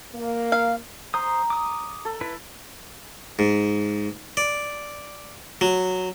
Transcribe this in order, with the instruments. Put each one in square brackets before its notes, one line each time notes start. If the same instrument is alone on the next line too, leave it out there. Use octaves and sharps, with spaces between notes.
[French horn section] A#3
[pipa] F5
[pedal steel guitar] C5 D#6 [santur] A#5
[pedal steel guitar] D6 D#6
[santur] A4
[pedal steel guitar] E4 B4
[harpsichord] G#2
D5
F#3